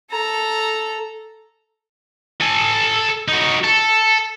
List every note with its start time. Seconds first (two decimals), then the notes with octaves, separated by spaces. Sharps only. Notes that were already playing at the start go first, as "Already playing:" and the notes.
0.11 A4 A#5
2.41 A4 G#5
3.28 D#4 F#4
3.64 A4